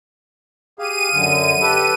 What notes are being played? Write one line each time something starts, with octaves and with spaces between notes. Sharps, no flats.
G4 G#4 F5 D#7
F#2 D3
G4 A4 B4